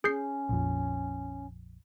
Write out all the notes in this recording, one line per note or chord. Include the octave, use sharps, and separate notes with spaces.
C#4 G#4 G6 C7
A#1 F2